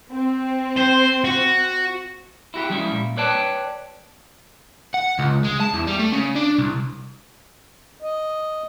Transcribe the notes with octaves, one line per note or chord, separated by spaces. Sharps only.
C4
C5
F#4
E4 F#4 G4
F3 G3 G#3 C#4 E4
A#2
B4 C#5 D5 G5 A5
F#5
C#2
G#3
A5
E2
G3
A3
C#3
D4
C2
D#5